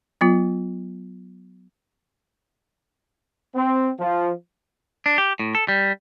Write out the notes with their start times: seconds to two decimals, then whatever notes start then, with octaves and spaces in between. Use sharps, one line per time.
0.21 F#3 B3 F4
3.56 C4
3.99 F3
5.06 D4
5.18 G4
5.39 A2
5.55 A4
5.68 G3